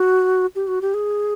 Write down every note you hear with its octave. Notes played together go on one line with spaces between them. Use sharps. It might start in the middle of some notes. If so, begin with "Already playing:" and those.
Already playing: F#4
G4
F#4
G4
G#4